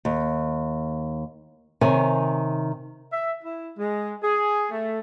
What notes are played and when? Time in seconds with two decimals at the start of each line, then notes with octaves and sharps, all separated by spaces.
0.05 D#2
1.81 C3 D#3 C#5 G#5
3.10 E5
3.41 E4
3.75 G#3
4.21 G#4
4.70 A3